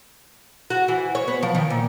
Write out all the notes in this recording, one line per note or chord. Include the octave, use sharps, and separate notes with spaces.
F#4
E3
C#5
B3
F3
D#3
A#2